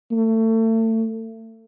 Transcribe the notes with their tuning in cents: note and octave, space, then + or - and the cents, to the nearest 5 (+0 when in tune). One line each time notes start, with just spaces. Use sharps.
A3 +30